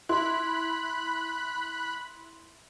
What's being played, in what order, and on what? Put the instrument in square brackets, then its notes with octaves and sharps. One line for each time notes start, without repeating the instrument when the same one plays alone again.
[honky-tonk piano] E4 [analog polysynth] B5 F#6 [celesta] C6